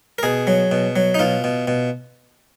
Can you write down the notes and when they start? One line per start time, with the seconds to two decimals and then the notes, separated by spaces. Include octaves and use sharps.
0.18 A#4
0.23 B2 G#4
0.47 F#3
0.71 B2
0.96 F#3
1.14 D#4
1.19 B2 F4
1.44 B2
1.67 B2